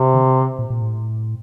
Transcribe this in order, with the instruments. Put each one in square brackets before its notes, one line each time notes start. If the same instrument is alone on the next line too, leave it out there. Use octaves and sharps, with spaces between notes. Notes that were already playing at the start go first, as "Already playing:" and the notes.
Already playing: [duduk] C3
[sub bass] D3
A#2
A#2
A2